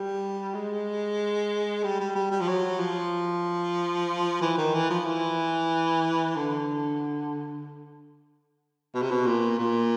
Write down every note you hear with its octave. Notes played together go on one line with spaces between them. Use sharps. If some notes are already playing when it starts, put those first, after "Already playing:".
Already playing: G3
G#3
G3
G3
G3
G3
F3
F#3
F3
E3
D#3
E3
F3
E3
D3
B2
C3
B2
A#2
A#2